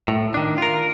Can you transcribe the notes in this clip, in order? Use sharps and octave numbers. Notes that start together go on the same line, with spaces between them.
A2
D#3 D4
F4 A#4